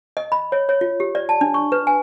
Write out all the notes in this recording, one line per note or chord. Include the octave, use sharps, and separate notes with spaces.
D#5
B5
C#5
C#5
F4
G4
D5
A5
D4
C#6
B4
G#5